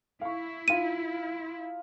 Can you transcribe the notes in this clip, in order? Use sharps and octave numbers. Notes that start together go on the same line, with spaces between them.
E4 F5 C#6
D#4 F4 D#7